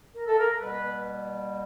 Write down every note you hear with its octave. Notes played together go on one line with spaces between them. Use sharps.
A#4
A4
A#4
B2 G3 A#3 B4